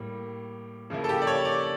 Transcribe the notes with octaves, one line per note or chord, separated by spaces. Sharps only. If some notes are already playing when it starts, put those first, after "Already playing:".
Already playing: A2 G3 A#3
C#3 F3 A#3 E4
A4
G4
D5
C#5
D5